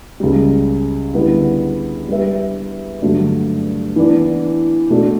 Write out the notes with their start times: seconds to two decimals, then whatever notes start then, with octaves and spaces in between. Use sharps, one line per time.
0.20 C#2 C#3 G3
1.14 D3 G3 B3 E4
2.08 G3 D4 G4 B4 E5
3.02 G2 D3 F#3 A3
3.96 E3 B3 D4
4.90 B2 A3 D4